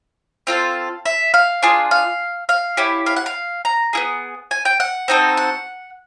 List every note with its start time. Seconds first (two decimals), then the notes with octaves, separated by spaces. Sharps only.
0.47 C4 F4 A4 F5
1.05 E5
1.34 F5
1.63 D4 F4 G#4
1.91 F5
2.49 F5
2.77 C#4 E4 G4
3.06 F5
3.16 F#5
3.26 F5
3.65 A#5
3.93 B3 E4 G#4
4.51 G#5
4.65 G5
4.80 F#5
5.08 C4 D#4 F#4 A4
5.37 F#5